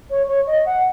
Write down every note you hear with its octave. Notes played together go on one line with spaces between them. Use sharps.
C#5
C#5
D#5
F#5